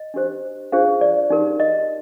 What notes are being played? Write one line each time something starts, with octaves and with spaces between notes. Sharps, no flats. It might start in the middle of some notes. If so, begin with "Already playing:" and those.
Already playing: D#5
D4 G4 C5
D4 F4 G#4 C5 F5
D5
D#4 G4 A#4
D#5